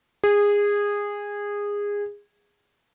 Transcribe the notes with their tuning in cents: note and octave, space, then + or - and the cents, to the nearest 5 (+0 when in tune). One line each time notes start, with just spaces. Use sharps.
G#4 -20